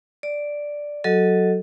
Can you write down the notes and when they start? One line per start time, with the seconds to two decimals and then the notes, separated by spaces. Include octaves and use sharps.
0.23 D5
1.04 F#3 F#4 A4 D#5